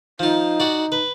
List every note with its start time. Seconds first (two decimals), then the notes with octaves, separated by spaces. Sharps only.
0.20 F3 D#4 F4
0.60 F#4 D5
0.92 B4